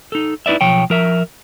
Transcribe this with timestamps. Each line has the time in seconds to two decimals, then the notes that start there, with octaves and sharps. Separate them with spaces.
0.12 D#4 A4
0.46 D#4 E4 B4 D5 E5
0.61 B1 F3 C#5 G5
0.90 F3 A#4 E5